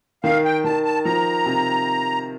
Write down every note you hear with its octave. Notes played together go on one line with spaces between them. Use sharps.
D#3 F5
G5
D#3 A5
A5
F3 A#5
C3